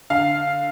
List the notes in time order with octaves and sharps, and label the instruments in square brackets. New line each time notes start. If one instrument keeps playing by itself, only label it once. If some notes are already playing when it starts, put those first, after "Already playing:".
[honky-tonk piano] D3 F5